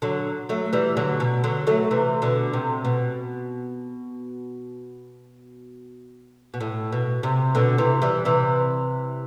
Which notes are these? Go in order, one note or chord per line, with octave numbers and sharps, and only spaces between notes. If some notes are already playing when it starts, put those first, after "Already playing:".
D3 F#3
F#3 A3
E3 G3
D3 F#3
B2
D3 F#3
F#3 A3
C3 E3
B2 D3
C3
B2
B2
A2
B2
C3
B2 D3
C3 E3
E3 G3
C3 E3